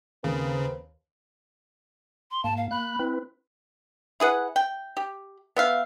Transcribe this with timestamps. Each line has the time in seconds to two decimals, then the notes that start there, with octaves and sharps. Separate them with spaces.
0.24 D#2 C#3 C4 A#4 B4
2.31 C6
2.44 G#2 A#3 A5
2.57 F5
2.71 A#3 B5 F#6
2.99 C4 E4 B4
4.20 E4 G#4 B4 F#5
4.56 G5
4.97 G4
5.57 B3 E5 F5